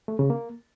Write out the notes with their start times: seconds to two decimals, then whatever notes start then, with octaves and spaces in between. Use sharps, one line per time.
0.08 A3
0.19 C#3
0.30 A#3